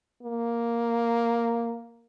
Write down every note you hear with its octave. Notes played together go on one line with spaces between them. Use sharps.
A#3